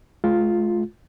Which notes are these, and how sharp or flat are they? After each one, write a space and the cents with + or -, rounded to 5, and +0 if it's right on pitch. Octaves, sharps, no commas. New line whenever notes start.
G#3 +40 F4 +0